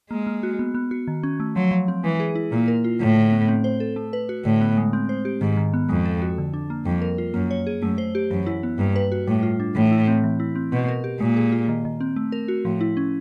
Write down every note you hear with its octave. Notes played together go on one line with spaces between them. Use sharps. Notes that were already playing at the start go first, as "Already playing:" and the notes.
G#3 A#3
A#3
F#4
B3
B3
F#4
D#3
C#4
A3
F3 F#3
F3
C4
E3 G#3
G#4
E4
A#2 A#3
A#4
F4
A2 D3
D3
B3
C4
C5
A4
A3
B4
F#4
A2 D3
B3
G#3
C4
C5
G4
G#2 D#3
D#3
B3
F2 G#3
A4
F#4
D3
D4
A#3
F2 G3
A#4
F4
F#2 A#3
C#5
G#4
F#2 A3
C5
G4
F#2 E3
E4
B3
G2 A#3
B4
F#4
A2 G3
F4
D4
A2 E3
E4
C4
E3
E4
C4
B2 C4
A#4
G4
A#2 G#3
G#4
F4
D#3
D#3
C4
A3
A#4
F#4
A2 F3
E4
C#4